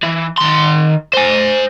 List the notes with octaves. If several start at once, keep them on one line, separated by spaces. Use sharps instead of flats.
E3
D#3 C6
C5 G#5